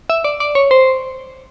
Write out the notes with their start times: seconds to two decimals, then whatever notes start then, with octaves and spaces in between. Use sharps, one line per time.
0.10 E5
0.25 D5
0.40 D5
0.55 C#5
0.71 C5